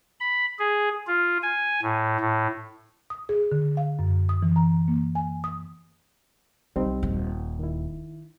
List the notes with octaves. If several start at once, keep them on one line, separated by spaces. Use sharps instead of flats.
B5
G#4
F4
G#5
A2
A2
D#6
G#4
D3
F5
F#2
D#6
E3
A#5
A#3
G#5
D#6
B1 G3 C4 D#4
D#1
D#3 E4